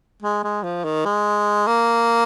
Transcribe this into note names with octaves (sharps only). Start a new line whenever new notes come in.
G#3
G#3
F3
D#3
G#3
A#3